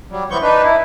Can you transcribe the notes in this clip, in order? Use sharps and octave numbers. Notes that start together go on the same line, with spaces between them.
F#3 G3
E3 B3 C4 C#6 G6
D4 D#4 B4
E4